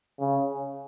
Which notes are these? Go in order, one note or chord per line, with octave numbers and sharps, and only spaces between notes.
C#3